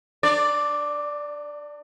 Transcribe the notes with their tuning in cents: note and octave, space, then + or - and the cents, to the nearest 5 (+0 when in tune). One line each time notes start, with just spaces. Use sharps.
D4 +35 D5 +0